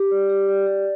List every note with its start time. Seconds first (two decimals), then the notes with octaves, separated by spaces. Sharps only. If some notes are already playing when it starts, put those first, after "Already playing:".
Already playing: G4
0.11 D5
0.30 G4
0.48 D5
0.66 G4